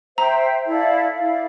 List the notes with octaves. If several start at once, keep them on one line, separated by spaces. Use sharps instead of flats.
C5 E5 G5 A#5
E4 A4 D5 F5
E4 A4 D5 F5